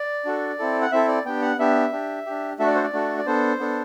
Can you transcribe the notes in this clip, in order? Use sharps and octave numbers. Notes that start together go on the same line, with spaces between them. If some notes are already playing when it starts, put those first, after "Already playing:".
Already playing: D5
D4 F#4 A4
C4 E4 A4
F#5
C4 E4 A4 E5
D5
B3 D4 G4 G5
F#5
B3 D4 G4 E5
D4 G4
D4 G4
A3 D4 F#4 A4 E5
D5
C5
D5
A3 D4 F#4 A4
D5
B3 D4 A4 C5
B3 D4 A4